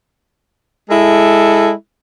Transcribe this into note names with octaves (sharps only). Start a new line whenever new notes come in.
G#3 E4 A4